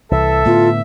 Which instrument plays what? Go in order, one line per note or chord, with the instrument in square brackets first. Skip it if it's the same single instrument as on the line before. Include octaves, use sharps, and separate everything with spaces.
[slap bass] C2 E3 [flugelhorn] A4 [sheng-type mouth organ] E5
[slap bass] A2 D3 B3 [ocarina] F4